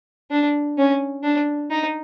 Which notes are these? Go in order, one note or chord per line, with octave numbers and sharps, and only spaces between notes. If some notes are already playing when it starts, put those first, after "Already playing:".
D4
C#4
D4
D#4